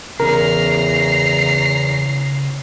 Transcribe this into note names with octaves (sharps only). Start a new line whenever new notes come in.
E2 C#3 C#4 A#4 A#5 C7